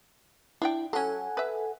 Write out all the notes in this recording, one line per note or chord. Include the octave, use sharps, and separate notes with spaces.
D4 E4 D5 G5
F#3 C#4 A4 F#5 G#5
B4 E5